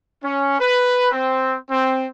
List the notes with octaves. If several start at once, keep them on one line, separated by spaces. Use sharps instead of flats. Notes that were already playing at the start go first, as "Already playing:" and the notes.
C#4
B4
C4
C4